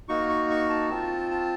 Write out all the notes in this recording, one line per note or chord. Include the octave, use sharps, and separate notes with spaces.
A#3 D#4 F#4 C#6
C#6
C#6
A5
C4 F4 A5
A5